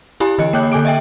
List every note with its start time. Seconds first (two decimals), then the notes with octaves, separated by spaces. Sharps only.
0.20 E4 G4 G#5 B5
0.38 D3 E3 D#5 F#6 C#7
0.53 A#3 C#5 G5 D6 F#6 G6
0.72 D3 A4 G#5 D6 D7
0.85 D#5 E5 G5